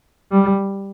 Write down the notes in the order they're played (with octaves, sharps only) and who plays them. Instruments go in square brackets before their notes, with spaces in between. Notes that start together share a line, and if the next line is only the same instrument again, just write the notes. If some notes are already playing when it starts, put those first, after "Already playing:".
[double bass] G3